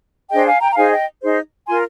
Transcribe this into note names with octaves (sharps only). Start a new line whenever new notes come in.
D4 G#4 C5 D#5 G5
F5 G#5
G5 A#5
A#5
D#4 G#4 C5 F5 G#5
D#5 G5
D#4 G#4 C5
F4 A#4 G#5 C6